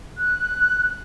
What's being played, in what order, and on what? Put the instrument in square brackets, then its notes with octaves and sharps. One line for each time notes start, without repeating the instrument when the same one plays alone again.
[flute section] F#6